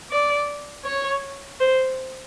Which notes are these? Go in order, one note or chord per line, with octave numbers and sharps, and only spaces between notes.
D5
C#5
C5